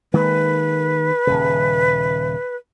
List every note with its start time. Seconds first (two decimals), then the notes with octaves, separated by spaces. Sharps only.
0.14 D#3 G#3 A#3 B4
1.27 D#1 A#1 C#3